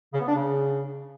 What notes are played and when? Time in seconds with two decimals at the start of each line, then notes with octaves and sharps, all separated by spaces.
0.14 C#3
0.21 B3
0.28 D4
0.36 C#3